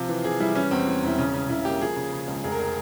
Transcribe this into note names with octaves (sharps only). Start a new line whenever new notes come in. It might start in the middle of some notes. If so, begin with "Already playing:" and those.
Already playing: C3 F3 F4
E3
C3 G#4
G3 E4
E3 C#4
E2 C4
E3
E1 E4
C#3 C#4
C#3 C#4
C#3 E4
A#3 G4
F3 G#4
C#3
C#3
C#2
F1 G#4
A#4
G#4